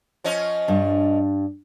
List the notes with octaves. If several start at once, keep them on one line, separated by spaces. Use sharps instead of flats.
F3 C#4 D#5
G2 D4